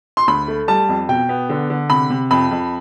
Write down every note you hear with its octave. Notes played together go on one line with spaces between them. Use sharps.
C6
D2 B5
A3
G3 A5
F2
B2 G5
B3
D3
D3
C3 B5
C3
F2 B5
F2